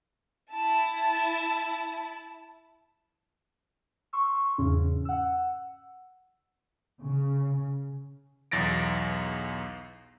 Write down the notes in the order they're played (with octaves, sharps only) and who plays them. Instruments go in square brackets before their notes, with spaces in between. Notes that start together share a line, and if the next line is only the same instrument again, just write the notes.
[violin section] E4 A5
[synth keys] C6 C#6 E6
E2 G#2 C#3 C#4
F#5 E6
[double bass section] C#3
[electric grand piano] B1 E2 A6 A#6 D7